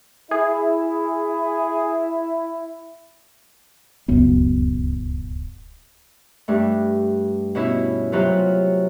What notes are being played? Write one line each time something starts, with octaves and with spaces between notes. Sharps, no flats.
E4 G#4
D1 C#2 F#2 B3
G2 A3
B2 C#4 E4
C3 F#3 F4 B4 F6